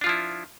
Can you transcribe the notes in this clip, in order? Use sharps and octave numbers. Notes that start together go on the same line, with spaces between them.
F3 D4 E4 F4